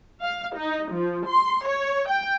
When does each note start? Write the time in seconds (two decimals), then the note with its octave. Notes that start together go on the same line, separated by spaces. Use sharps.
0.22 F5
0.56 D#4
0.92 F3
1.26 C6
1.66 C#5
2.08 G5